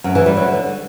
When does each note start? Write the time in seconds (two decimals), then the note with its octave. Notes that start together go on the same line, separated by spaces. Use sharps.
0.04 F#2
0.15 E3
0.26 G3
0.37 F#3
0.48 D3